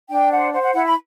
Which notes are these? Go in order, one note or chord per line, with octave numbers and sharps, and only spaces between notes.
D4 G5
C5 F#5
C5 F#5
F#5
E4 F#5
B5